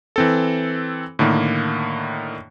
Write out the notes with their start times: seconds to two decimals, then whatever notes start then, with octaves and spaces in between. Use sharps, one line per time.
0.16 E3 C4 A4
1.19 A2 D3 D#3 A#3